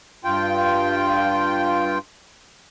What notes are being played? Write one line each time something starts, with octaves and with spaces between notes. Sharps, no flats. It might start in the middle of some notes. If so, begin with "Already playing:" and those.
G2 F4 G5